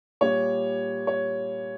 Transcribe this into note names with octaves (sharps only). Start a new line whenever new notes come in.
A#2 G3 C#5
C#5